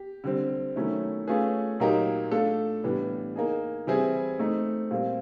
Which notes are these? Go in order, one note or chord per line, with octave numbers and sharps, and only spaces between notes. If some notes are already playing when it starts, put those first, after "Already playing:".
Already playing: G4
D3 G3 C4
D#3 F#3 A3 C#4 E4
A3 C#4 F4 G#4 B4
A#2 F#3 A#3 D#4 G4
A3 D4 F4 A4
A2 E3 G3 B3 D4
A#3 D#4 G#4
E3 G3 C4 E4 G#4
A3 C4 D#4
A#2 G3 C4